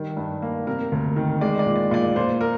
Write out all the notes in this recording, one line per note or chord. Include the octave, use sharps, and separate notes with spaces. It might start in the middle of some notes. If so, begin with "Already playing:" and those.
Already playing: D#3 G3
G2
A#3
C3 A#4
D2
D#3
G#3 D5
D5
A#2
D5
A#2 D5
A#2 C5
A#4